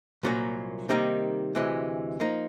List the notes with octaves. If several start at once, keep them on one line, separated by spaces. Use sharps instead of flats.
C2 A#2 F#3 A#3 C#4
C3 D#3 G3 A#3 D#4
D2 C3 E3 G#3
F3 A#3 D#4